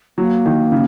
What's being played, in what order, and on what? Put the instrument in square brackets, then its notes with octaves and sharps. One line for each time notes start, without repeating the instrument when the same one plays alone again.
[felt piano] F#3 [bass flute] A#3
[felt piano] D#3
C#3